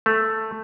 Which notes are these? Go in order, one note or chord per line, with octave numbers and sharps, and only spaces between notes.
A3